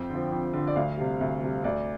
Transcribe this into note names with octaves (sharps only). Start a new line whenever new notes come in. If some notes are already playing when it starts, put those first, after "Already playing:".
Already playing: F2 G5
D3 F3
F2
D3 F3
D5
D2 F5
C3 G3
D2
C3 G3
D2 D5